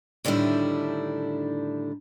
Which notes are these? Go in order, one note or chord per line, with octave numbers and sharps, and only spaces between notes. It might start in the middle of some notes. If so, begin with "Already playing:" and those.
A2 D3 D#3 G3 D4 E4